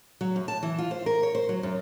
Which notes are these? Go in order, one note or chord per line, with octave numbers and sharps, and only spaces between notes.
F#3
F#2
A5
E3
F4
C5
A#4
C#5
C5
F#3
F#2